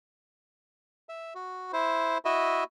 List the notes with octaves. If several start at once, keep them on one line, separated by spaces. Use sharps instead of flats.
E5
F#4
E4 C5
E4 F#4 D#5 E5